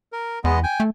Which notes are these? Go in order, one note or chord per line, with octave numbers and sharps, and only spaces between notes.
A#4
E2 G#3 B3 D#5
G5 G#5
A3